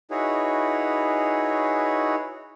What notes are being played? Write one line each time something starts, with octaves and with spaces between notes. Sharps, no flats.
D#4 E4 F#4 G#4 B4 C#5